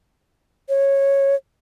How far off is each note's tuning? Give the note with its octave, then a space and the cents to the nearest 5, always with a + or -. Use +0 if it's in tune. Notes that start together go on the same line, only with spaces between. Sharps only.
C#5 -10